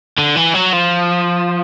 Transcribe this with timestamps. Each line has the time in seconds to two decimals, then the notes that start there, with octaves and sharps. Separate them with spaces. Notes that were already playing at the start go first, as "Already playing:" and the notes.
0.19 D3
0.37 E3
0.55 F#3
0.73 F3